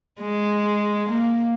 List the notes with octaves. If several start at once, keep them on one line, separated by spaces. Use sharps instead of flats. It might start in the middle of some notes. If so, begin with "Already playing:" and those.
G#3
A#3